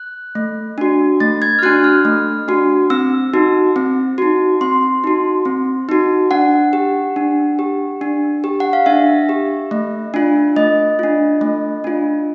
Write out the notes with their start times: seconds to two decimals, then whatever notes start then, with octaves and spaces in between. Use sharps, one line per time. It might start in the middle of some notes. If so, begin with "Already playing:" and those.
Already playing: F#6
0.35 A3
0.78 D4 F#4
1.20 A3 A6
1.42 G#6
1.59 F6
1.63 D4 F#4 F#6
1.84 F6
2.05 A3
2.48 D4 F#4
2.90 C4 E6
3.34 D#4 F#4
3.76 C4
4.18 D#4 F#4
4.61 C4 C6
5.04 D#4 F#4
5.45 C4
5.89 D#4 F#4
6.31 D4 F#5
6.73 G4
7.16 D4
7.59 G4
8.01 D4
8.44 G4
8.60 F#5
8.73 F5
8.86 D4 E5
9.29 G4
9.71 A3
10.14 D4 F4
10.56 A3 D#5
10.99 D4 F4
11.41 A3
11.84 D4 F4